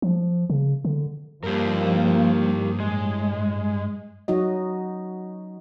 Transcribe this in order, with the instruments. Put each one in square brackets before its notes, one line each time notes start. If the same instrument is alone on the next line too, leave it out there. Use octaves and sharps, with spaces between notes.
[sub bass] F3
C#3
D3
[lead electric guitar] G2 [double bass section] F3 A#3 [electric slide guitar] G4 A#4
[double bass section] A2 [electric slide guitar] G#3
[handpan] F#3 D#4 F#4 D#5